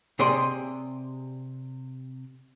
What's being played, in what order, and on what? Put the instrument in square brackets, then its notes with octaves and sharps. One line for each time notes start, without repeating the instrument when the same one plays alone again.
[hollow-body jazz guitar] C3 G#4 D5 D#5 C6